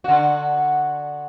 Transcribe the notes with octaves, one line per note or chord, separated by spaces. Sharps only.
D3 F#4